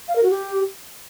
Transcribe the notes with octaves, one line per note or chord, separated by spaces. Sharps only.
F5
A#4
F#4
G4